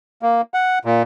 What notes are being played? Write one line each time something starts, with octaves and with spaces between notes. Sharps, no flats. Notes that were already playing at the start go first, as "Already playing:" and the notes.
A#3
F#5
A#2